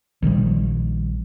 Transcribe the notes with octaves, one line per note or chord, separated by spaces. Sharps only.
A#1 D#3 F3 G3